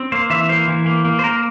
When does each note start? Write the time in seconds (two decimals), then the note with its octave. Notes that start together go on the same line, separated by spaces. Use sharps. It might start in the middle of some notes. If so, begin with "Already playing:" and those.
Already playing: C4
0.12 A#3 C5
0.30 E3 E5
0.49 A#3 C5
0.68 E3
0.86 A#3
1.05 A#3
1.19 C5
1.24 A#3 A#4